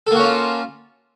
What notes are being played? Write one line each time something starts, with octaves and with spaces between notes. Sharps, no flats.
A#3 C#4 F4 F#4 A4